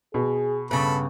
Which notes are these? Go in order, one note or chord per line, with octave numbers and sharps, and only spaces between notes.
B2 G#4
G2 C#3 B3 A4 B5